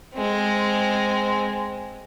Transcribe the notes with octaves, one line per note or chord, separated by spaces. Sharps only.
G#3 C4